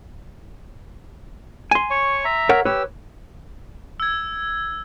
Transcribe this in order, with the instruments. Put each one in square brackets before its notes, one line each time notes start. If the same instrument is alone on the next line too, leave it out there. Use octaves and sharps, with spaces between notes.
[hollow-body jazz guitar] G#5 C6
[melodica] C#5 C#6
E5 A#5
[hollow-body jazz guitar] A#4 C#5 F#5
[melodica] G4 E6 [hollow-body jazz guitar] B4 C#5
[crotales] E6 G#6